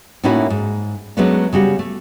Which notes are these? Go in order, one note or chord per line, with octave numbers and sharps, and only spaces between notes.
A2 A#3 C#4 D#4 E4 F#4
G#2
F#3 G#3 A3 B3 C#4 D4
C#3 G3 F#4
A3